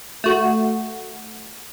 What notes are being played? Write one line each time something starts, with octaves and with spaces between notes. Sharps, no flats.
A3 F#4